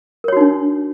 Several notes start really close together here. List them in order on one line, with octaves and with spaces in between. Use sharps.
A#4 C#5 F#4 D#4 D4